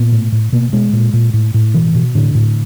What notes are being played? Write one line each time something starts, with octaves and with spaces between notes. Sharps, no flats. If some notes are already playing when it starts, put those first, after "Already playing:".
Already playing: A#2 B3
A2
A2
B2 A#3
B2 G#3
A#2
A#2
A2
A2
B2 E3
B2
A2 D3
A2